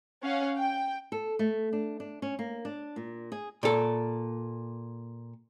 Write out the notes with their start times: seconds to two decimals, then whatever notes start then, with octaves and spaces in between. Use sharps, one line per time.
0.23 C#4 C#5 F5 F#5
0.58 G5
1.12 A4
1.39 A3
1.73 D4
2.00 D4
2.22 C#4
2.39 A#3
2.65 D4
2.96 A#2
3.32 G#4
3.63 A#2 A4